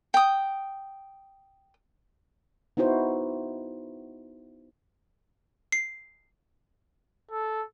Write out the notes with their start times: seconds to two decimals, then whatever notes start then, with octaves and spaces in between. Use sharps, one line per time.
0.14 G5 D#6
2.77 B3 D#4 E4 F#4 C5
5.72 C7
7.31 A4